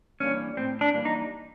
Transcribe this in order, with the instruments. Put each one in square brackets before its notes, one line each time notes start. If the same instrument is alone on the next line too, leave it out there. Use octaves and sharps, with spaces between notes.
[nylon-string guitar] E3 G3 A#3 D4 [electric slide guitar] C#4
[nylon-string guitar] A2 [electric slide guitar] C4
[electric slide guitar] D4
[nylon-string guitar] E3 G3 A#3 D4
[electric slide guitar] D#4